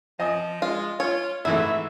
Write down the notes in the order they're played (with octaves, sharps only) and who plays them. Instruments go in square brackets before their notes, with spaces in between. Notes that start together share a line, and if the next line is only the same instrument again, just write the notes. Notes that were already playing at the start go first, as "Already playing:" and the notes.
[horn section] F3 [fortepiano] D#5 G#5 D#6
[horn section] G#3 [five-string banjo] F4
[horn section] F4 [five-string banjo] C#5
[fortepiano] G#2 E3 A3 [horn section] G#3 E5 [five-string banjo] E4